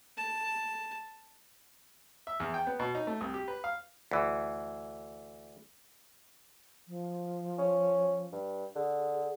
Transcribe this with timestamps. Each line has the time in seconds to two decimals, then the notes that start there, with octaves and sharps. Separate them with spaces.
0.18 A5
2.27 E5
2.40 E2
2.54 G5
2.67 B3
2.80 B2
2.95 D#4
3.07 A3
3.21 C2
3.34 G4
3.48 B4
3.64 F5
4.11 D2 E3
6.88 F3
7.59 C#4
8.32 G2
8.76 D3 G#4